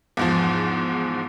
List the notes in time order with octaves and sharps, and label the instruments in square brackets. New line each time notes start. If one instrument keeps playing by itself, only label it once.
[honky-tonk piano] E2 G#2 F3